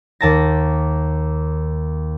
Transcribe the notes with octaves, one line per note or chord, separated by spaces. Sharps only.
D#2 A5 A#6